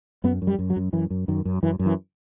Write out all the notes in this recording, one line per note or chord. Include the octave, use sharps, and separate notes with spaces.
F#2 B3
F#2
G3
F#2
F#3
F#2
F#2 E3
F#2
F#2 D#3
F#2
F#2 E3
F#2
E3